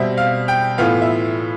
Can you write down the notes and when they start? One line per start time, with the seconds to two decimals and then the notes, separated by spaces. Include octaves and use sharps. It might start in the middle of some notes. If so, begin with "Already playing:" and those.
Already playing: B2 G3 C4 E5
0.17 F5
0.48 G5
0.78 A2 E3 B3 F4 F5
1.02 E5